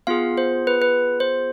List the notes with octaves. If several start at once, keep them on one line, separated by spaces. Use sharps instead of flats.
B3 F4 G#4 F5
C5
B4
B4
C5